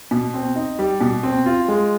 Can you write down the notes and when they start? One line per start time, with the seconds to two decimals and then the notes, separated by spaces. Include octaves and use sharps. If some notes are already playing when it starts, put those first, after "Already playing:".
0.11 B2
0.34 C4
0.56 D#4
0.79 G3
1.01 B2
1.23 C4
1.46 F4
1.68 G#3